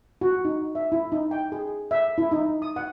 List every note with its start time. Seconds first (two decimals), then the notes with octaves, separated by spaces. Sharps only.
0.21 F#4
0.45 D#4
0.75 E5
0.92 E4
1.12 D#4
1.31 G5
1.52 G#4
1.91 E5
2.18 E4
2.31 D#4
2.62 D#6
2.76 F#5